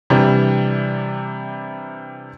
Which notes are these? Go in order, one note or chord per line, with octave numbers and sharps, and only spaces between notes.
C3 E3 G3 D4